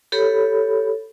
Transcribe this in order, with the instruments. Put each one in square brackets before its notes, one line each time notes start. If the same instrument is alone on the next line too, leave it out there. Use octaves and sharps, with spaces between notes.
[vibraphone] G4 A4 C#5 B5